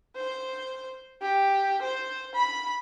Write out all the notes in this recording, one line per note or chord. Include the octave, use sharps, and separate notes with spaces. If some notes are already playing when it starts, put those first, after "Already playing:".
C5
G4
C5
B5